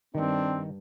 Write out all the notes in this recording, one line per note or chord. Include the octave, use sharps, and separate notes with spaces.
G2 D#3 C4 D4